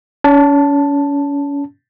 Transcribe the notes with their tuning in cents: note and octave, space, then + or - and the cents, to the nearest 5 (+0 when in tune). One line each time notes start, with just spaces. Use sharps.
C#4 +35 A5 +0